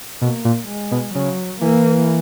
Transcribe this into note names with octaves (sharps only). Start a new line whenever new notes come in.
B2 A#3
A#2
G#3
B2
C#3 F#3
E3 A#3